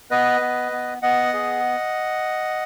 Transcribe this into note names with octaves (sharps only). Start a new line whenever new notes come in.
B3 B4 D#5
B3
B3
B3 D#5 F#5
G#4